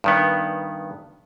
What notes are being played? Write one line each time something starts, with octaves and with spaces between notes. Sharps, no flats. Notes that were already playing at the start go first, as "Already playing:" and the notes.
G2 D#3 B3